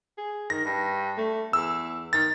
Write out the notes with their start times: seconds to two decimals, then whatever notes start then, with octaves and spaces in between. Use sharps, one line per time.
0.18 G#4
0.50 D#3 A#6
0.65 G2
1.17 A3
1.53 E2 E6
2.13 D#3 A6